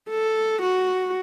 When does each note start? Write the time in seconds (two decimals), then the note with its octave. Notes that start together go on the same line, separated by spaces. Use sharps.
0.10 A4
0.62 F#4